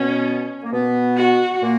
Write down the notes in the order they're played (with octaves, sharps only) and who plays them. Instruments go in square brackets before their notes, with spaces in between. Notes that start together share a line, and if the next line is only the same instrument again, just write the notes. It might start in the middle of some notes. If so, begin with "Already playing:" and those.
Already playing: [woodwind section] B2 B3 [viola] C#4
[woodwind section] A#3
B2 B3
[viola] F#4
[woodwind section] A#2 A#3